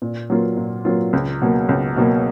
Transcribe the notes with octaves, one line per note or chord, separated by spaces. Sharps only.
A#2
F#3 A#3 F4
A#2
F#3 A#3 F4
C#2
B2 F#3 A#3
C#2
B2 F#3 A#3